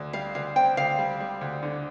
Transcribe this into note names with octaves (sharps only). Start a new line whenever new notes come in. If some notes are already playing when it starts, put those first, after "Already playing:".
Already playing: D2
G3 F5
D2 F5
C4 G5
D2 F5
G3
G3
D2
D3